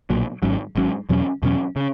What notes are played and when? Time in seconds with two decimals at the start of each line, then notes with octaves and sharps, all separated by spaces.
0.10 B1 A#2 F#3
0.43 G#1 G#2 F#3 C#4
0.76 G#1 G#2 F#3 C#4
1.09 E2 B2 F#3 C#4
1.43 E2 B2 F#3 C#4
1.76 C#3